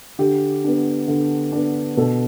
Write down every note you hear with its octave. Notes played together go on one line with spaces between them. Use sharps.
D3 G4
B3 D4
D3
B3 D4
B2 A4